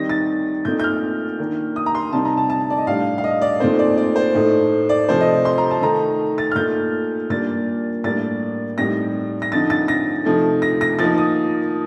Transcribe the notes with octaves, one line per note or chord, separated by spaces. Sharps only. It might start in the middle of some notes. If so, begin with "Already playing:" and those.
Already playing: D#3 G3 C4 D#4 A#6
A6
A#2 A3 C4 D#4 G6
G6
F6
D#3 A#3 D4
D#6
A#5
C6
C3 G3 C4 D#4 A5
A#5
A5
A5
D5
D#5
A2 G3 D4 F5
F5
D#5
D5
A#2 A3 C4 D#4 C5
D5
D5
C5
A2 A3 D#4
D5
C3 F3 A3 C5
D#5
C6
A#5
A5
D#3 A3 D#4 A#5
A6
F6
A#2 A3 D#4 G6
A#2 G3 A#3 D4 A6
A2 G3 A#3 D4 A6
A2 G3 C4 D#4 A#6
A#6
D3 F3 C4 D#4 A6
A6
A#6
C3 F3 A3 D#4
A#6
A#6
F3 A#3 D#4 A6
D#6